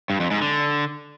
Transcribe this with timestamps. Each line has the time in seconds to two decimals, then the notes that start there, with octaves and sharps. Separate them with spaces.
0.10 G2
0.20 F2
0.31 G#2
0.41 D3